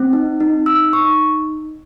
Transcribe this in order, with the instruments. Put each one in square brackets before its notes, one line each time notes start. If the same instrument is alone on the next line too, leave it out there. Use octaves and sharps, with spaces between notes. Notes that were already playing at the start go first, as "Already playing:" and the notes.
Already playing: [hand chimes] C4
D#4
D#4
D#4 E6
D#4 C#6